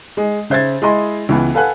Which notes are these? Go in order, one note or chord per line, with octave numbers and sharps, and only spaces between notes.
G#3
C#3 C5 E5 G#6 A6
G#3 E4 D#5 C6
C#2 E3 B3
A4 B4 F5 F#5 G#5 F#6